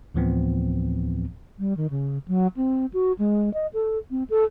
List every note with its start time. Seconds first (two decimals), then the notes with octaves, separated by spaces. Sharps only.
0.14 D2 A2 E3 F3 B3 C4
1.59 G3
1.77 D#3
1.90 C#3
2.28 F#3
2.57 C4
2.94 F#4
3.19 G#3
3.54 D#5
3.73 A4
4.11 C4
4.30 A4